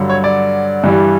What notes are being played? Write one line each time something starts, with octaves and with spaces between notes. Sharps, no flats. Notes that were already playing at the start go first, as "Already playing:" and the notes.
Already playing: G2 D3 F#3
C#5
D5
G2 E3 G3